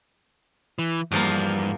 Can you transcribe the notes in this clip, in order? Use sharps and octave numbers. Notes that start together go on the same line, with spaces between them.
E3
E2 G2 F3 A#3